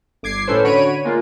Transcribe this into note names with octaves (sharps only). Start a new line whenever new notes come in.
G1 D6 G#6 C7
A2 C#4 A4 B4 C5
D3 F#4 C#5 B5 D7 D#7
G#3 A#3 F4